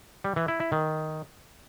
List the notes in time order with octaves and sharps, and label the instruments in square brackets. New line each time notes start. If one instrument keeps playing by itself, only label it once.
[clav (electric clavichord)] G3
E3
E4
E4
D#3